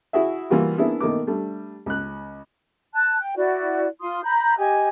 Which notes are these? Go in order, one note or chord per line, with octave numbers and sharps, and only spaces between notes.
E4 F#4 G#4 E5
E3 G3 A#3 F4 F#4
A#3 B3 D4 E4 G#4
B2 D#3 A3 A#3 D6
G3 A3 D4
C#2 F#6
A5 F#6
G5
E4 F#4 D5
F4 C6 D#6
A#5 B5 G6
G4 D#5 G#5